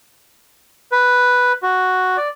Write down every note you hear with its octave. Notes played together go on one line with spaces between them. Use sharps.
B4
F#4
D5